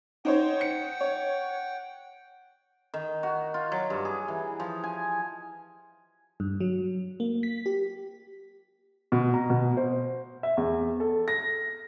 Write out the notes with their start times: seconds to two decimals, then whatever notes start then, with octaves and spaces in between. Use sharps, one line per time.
0.25 D#4 C5 C#5 F#5 G5
0.61 C#7
1.01 C#5
2.94 D#3
3.23 F#4
3.54 F4
3.72 F#3
3.90 G2
4.05 G#4
4.28 E3
4.60 F3
4.84 G#5
6.40 G2
6.60 F#3
7.20 A#3
7.43 B6
7.66 G4
9.12 B2
9.34 A#5
9.50 B2
9.77 C5
10.43 E5
10.57 E2
11.00 A4
11.28 A#6